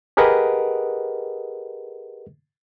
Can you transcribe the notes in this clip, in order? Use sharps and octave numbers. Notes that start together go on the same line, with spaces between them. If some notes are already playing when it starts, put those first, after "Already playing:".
G4 G#4 A#4 B4 D#5 F#5